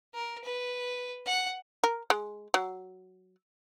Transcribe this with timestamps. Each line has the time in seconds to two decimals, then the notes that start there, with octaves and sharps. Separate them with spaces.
0.14 A#4
0.44 B4
1.26 F#5
1.84 A#4
2.10 G#3
2.54 F#3